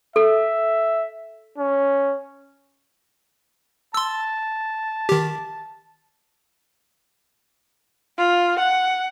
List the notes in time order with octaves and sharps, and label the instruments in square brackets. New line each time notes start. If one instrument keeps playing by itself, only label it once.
[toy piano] A4 [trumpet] E5
[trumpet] C#4
[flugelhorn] A5 [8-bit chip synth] C6 E6
[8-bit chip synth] D#3 G4
[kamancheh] F4
F#5